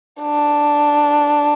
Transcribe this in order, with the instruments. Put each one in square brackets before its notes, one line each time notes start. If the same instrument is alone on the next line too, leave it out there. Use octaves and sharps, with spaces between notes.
[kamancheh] D4